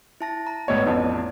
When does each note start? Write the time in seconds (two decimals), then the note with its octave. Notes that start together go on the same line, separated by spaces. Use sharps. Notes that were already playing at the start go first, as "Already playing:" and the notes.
0.21 E4 A5 A#6
0.47 A#5
0.68 G#1 A2 B3 C#5 D#5
0.86 A1 F2 D#4 E4 D5